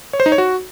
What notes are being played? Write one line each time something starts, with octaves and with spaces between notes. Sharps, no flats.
C#5
C5
D#4
C#5
F#4